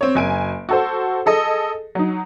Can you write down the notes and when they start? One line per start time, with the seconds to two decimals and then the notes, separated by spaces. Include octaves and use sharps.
0.01 C4 C#5
0.15 F#1 G#5 D7
0.69 F#4 A4 C5
1.26 G#4 A4 D#5
1.95 F#3 D#4